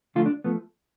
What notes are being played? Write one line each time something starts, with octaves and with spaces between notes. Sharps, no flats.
D3 F3 A3 F4
D4
F3 A3 B3